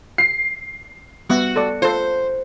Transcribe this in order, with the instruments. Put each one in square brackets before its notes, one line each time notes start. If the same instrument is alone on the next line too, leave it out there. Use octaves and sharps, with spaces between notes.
[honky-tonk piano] C7
[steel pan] G3 B3 E5 [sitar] F#4
[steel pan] A4 D5
[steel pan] F4 A4 [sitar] C5